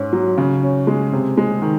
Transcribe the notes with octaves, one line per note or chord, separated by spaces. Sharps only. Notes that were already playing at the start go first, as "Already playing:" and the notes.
Already playing: G#2 C#4
F#3
C#3
C#4
G#3
C3
G#3
D#3